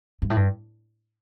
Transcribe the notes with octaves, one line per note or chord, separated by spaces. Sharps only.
G2
A2
G2